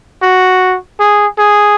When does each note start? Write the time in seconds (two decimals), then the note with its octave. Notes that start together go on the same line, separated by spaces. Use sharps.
0.22 F#4
0.99 G#4
1.38 G#4